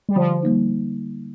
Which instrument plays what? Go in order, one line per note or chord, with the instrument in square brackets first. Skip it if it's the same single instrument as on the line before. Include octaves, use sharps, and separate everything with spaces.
[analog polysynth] G3
[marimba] D3 [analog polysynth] F3
[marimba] G3 A#3 D#4